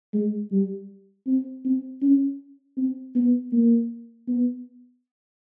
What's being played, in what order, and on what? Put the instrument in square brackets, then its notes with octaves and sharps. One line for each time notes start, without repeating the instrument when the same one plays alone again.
[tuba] G#3
G3
C4
C4
C#4
C4
B3
A#3
B3